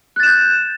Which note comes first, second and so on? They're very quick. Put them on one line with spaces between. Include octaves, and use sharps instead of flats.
F#6 A6 E7 G6